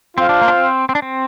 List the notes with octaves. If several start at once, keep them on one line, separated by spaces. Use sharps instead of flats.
C4 F4 C5 F5
D4
A#3
D4
C4
C4
D4
C4